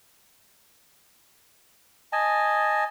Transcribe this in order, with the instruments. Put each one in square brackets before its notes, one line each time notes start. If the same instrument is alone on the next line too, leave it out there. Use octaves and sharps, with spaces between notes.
[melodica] D#5 G#5 A5